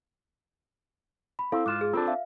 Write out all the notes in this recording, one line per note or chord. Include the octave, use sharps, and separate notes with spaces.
B5
C4 E4 A4 F5
G#2 F4 D6 F#6 E7
G#4
C4 D4 F4 A4
E5 F5